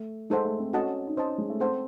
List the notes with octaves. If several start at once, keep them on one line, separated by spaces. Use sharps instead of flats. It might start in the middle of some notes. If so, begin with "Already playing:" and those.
Already playing: A3
G#3 D#4 A4 C5 F#5
A3
C4
C#4 F#4 A4 D#5 F#5 A5
D#4
C#4 C5 D#5 A5
G#3
A3
C4 A4 C5 F#5